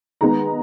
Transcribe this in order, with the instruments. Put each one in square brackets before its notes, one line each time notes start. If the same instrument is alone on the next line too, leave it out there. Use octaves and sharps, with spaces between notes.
[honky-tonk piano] D#3 G#3 B3 A#5